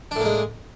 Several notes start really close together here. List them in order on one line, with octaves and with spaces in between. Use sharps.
D4 A2 A#3 G#3